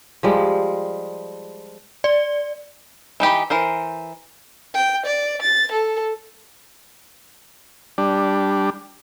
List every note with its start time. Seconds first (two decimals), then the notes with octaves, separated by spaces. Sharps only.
0.23 F3 G3 G#3
2.04 D5
3.20 E3 D#4 G4 B5
3.50 E3 A#4 C5
4.74 G5
5.06 D5
5.42 A6
5.72 A4
7.98 G3 D4